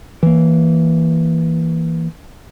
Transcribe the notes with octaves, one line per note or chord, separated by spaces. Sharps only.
E3 A#3